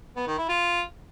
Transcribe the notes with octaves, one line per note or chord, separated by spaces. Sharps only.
B3
D#3
E4
F4